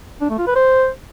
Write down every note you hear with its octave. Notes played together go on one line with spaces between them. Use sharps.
D4
A3
F4
B4
C5